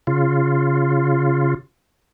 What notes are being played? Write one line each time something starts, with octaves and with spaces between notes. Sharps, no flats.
C#3 F4